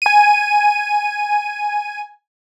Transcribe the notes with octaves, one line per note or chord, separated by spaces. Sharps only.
G#5 D#7